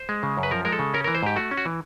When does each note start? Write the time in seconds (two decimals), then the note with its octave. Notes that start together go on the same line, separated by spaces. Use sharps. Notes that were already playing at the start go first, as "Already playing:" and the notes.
Already playing: C5
0.09 G#3
0.23 C#3
0.38 F#2
0.43 B4
0.51 F3 A#4
0.65 G#3 A#4
0.72 A4
0.79 C#3
0.94 C#4 A#4
1.04 E3 A#4
1.15 C5
1.23 G#2 G4
1.36 A3 F#4
1.51 C#4
1.57 F#4
1.65 E3